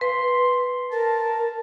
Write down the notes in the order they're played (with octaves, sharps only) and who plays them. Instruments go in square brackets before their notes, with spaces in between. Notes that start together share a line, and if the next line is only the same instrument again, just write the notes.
[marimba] B4 [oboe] C6
[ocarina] A#4 [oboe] A5